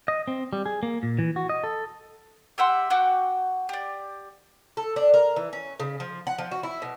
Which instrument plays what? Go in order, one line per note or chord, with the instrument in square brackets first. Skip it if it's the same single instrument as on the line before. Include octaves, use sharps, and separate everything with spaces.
[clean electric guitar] D#5
C4
G3
G#4
A#3
A#2
E3
F#4
D#5
A4
[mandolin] G4 E5 F#5 C6
F#4 F#5 G5 D6
G4 D5
[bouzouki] A4
D4
A#4
E3
C#4
C#3
F3
F#5
F3
F#4
E4
B2